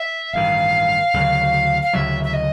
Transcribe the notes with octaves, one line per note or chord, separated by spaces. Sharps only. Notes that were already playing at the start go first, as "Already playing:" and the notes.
Already playing: E5
A1 G2 D#3 F5
D2 C#3 F#3
F5
D2 C#3 F#3 E5
E5
D#5